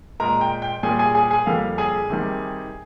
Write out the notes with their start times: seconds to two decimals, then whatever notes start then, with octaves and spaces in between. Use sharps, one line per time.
0.20 A#2 G#3 A#4 A#5
0.41 G5
0.62 G5
0.83 A#2 G3 A#3 G#4 G#5
0.99 G#4 G#5
1.15 G#4 G#5
1.31 G#4 G#5
1.46 F2 D3 G3 A#3 F5
1.78 G#4 G#5
2.10 C3 D#3 G3